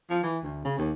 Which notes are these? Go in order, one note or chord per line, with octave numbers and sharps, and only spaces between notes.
F3
E3
D2
C#3
D#2